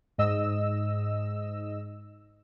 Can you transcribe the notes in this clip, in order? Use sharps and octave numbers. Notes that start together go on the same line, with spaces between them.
G#2 D#5 E6